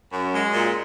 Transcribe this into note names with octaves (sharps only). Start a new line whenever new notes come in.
F#2
G#3
A#2